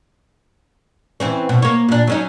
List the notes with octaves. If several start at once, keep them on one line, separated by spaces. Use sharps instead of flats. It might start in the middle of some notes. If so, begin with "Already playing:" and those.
E3 C4 C#4
B2
A#3 C#5
A#2 D4
F#3 C#4 D#4